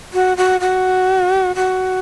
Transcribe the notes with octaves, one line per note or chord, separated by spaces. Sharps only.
F#4
F#4
F#4
F#4